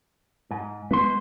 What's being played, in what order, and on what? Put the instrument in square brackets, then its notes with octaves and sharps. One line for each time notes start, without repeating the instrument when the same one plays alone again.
[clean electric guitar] G#2
[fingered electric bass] G#3 B3 [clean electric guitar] B4 C6